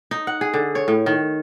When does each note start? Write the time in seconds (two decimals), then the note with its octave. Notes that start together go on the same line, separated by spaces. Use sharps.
0.11 D#4
0.27 F#5
0.41 G#4
0.54 D3
0.75 C#5
0.88 A2
1.06 D#3